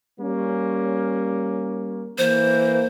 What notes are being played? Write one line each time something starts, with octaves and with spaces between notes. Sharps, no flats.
G3 A#3 C#4
E3 A#3 C5